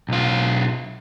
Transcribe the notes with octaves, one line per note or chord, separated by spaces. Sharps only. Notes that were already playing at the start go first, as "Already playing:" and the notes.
B1 F4